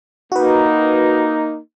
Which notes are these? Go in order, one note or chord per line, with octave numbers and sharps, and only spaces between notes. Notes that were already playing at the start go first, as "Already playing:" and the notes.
A#3 D#4 F#4 B4